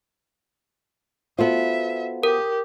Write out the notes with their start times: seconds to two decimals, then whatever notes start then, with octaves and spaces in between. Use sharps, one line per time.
1.38 B3 F4 F#4 A4 C5 E5
2.23 G4 A#4